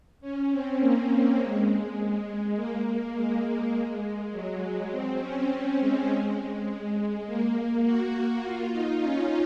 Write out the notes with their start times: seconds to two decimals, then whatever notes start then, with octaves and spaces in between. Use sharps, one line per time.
0.21 C#4
0.51 C4
0.80 A#3
1.39 G#3
2.56 A#3
3.14 G#3
4.32 F#3
4.62 G#3
4.91 C4
5.20 C#4
5.50 C4
5.79 G#3
6.68 G#3
7.26 A#3
7.85 F#4
8.43 F4
8.72 D#4
9.01 C#4